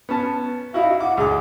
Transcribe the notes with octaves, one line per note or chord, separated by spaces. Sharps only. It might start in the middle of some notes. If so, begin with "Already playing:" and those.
B3 C#4 A5
D#4 E4 F#4 F5
F#5 D6
D2 G#4 D6